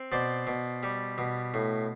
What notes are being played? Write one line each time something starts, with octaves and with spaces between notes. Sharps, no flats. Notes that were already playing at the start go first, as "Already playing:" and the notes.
Already playing: C4
B2 C5 D5
B2
G3
B2
A2